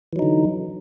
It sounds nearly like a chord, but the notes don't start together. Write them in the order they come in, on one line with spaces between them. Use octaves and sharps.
E3 F#3 D#4 D3